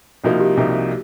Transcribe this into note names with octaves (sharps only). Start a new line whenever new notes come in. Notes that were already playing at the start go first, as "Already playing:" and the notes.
C2 C3 F3 A#3 D#4 F#4
G4
C2 C3 F3 A#3 D#4